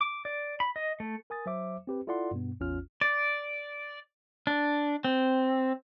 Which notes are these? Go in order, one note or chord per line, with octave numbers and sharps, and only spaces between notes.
D6
D5
B5
D#5
A3
A#4 G#5 D#6 A6
F#3 C5 E5 D6
C4 G4 B4
E4 F4 A4 D5 F#5 C6
G2 B2 B3
A1 E2 C#4 F4 F6
D5
D4
C4